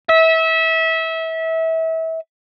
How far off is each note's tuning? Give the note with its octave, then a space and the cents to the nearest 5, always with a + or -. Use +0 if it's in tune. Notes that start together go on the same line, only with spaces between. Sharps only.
E5 -25